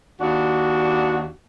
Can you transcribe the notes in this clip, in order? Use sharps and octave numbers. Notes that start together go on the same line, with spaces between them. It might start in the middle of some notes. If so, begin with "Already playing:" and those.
D#2 D4 F#4